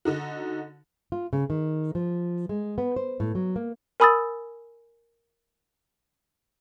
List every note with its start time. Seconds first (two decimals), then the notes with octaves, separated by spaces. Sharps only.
0.05 D3 D#4 F#4
1.12 F4
1.33 C#3
1.50 D#3
1.95 F3
2.49 G#3
2.78 B3
2.96 C5
3.20 A2
3.35 F#3
3.56 A#3
4.00 A#4 G#5 B5 D#6 E6 A6